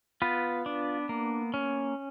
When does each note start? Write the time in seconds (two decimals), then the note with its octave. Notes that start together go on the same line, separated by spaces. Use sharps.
0.22 B3 F4 B4
0.66 D4
1.09 A#3
1.54 C#4